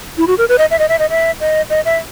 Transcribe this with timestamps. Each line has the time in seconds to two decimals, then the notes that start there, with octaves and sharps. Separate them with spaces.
0.18 E4
0.27 F#4
0.38 A#4
0.49 B4
0.58 D#5
0.71 E5
0.79 D#5
0.89 E5
0.99 D#5
1.10 E5
1.40 D#5
1.70 D#5
1.85 E5